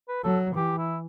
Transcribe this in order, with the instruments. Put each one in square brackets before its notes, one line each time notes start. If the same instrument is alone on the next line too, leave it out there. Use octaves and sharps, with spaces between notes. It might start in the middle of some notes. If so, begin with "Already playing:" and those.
[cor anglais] B4
[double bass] F#3 [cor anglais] A4
[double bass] E3 [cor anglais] G4
[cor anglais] E4